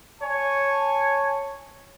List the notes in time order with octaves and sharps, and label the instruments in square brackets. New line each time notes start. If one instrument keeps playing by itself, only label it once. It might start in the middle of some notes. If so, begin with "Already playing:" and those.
[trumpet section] C#5 G#5 A5